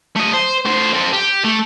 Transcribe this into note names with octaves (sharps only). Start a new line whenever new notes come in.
A3 D#5
C5
A3 C5
C4 A4
G4
A3